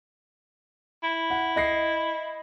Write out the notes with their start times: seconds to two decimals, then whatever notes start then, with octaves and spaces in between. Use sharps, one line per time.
1.03 E4
1.30 F#5
1.56 D#5 A#6 C7